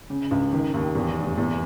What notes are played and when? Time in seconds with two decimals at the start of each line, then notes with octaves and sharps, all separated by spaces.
0.10 C#3
0.31 C#2
0.53 D#3
0.74 D#2
0.95 E2
1.17 F1
1.38 E2